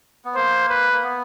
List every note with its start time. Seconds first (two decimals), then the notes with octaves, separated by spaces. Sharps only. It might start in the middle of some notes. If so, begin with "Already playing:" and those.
0.25 B3
0.35 A#3 C5
0.69 B4
0.93 A#3
1.03 B3